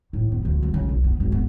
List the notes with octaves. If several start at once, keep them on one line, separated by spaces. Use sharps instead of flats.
A2
B3
D2
C2
C#3
B1
B3
G#1
B3